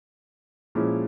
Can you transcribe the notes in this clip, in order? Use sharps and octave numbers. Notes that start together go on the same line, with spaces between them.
A#2 F3 G#3 C#4 E4